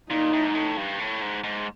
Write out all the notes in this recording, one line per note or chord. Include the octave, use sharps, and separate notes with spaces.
A#2 D#4
A2
G#2
A2
G2
A2
G#2
G#2